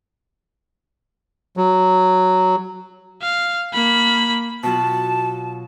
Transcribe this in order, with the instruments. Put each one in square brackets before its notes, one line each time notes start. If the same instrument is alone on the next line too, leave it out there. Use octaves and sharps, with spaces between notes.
[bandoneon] F#3
[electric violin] F5
A#3 B5
[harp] B2 F#3 F4 [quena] A5